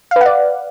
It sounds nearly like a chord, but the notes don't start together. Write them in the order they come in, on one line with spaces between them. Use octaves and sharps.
F5 B4 F#5 D5